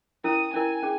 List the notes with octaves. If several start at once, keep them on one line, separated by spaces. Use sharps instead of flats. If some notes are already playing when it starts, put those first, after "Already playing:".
C#4 E4 A#4 D#6
C#4 E4 A#4 G#5
C#4 G#4